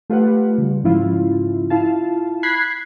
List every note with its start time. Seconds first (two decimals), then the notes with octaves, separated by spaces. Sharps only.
0.10 A3 F4 G4 B4 F#5
0.58 C#3 G3
0.84 G#2 C#3 F3 C#4 E4 F4
1.70 E4 F4 F5 A5
2.43 B5 F#6 G#6 B6 C7